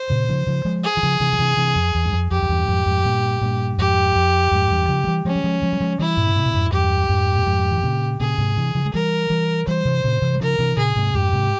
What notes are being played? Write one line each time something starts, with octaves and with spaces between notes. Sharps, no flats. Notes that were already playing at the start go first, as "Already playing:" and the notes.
Already playing: C5
A#2 C#3
C#3 F3
C#3 F3
F3 G#3
G#4
E3
C#3 F3
C3 E3
F3
C3 E3
C3 E3
F2
E2
G2
F2
F2 G4
F2
E2 G2
F2 G#2
F2 G#2
G2 A#2
G2 A#2
F2 G#2 G4
F2
F2 G#2
E2 G2
C#3 F3
G#3
E3 G3
F3 G#3 C#4
G3
F3 G#3
F3 G#3
G3
F3 G#3
E3 G3 E4
G2 A#2
C#3
G#2 C3
A#2
F2 G#2
E2 G2 G4
F2 G#2
A#2
F2 G#2
E3
A#2 C#3
A#2 C#3 G#4
G#2 C3
C3 E3
C#3 F3
G#3
E3 G3 A#4
E3 G3
E3 G3 C5
C3 E3
A#2 C#3
C3 E3
G3
C#3 F3 A#4
C3 E3
A#2 C#3 G#4
G#2 C3
F2 G#2 G4
G#2 C3